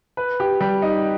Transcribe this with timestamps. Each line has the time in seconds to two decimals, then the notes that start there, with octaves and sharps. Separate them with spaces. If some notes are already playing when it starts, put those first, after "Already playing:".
0.17 B4
0.40 G4
0.60 G3
0.82 D#4